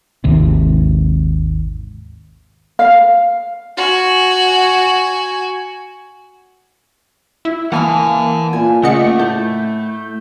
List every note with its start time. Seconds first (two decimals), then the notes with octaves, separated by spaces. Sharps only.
0.24 G#1 D#2 C3
2.79 F5
3.77 F#4 G#5
7.45 E4
7.72 E3 A#3 F5 F#5 G#5 A5 D#6
8.53 A#2 G#5
8.83 A#2 C#3 A3 D5 D#5 F#5 C#7
9.19 A2 A4 G6